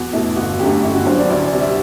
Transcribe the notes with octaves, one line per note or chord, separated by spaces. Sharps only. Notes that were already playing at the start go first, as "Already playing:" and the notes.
Already playing: E2 F#4
B2 A3 E4
G1 F#4
F#2 D3 A3 G4
G1 E4
F#4
G2 F#3 C5
D5
D2 E5
D5
C3
G3 E5